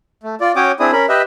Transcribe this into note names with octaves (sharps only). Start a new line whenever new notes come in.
A3
F4 D5
C#4 F#4 C#5 G5 D6 D#6
C4 D4 E4 G#4 D#6
C#4 A#4 B5
G4 B4 D#5 E5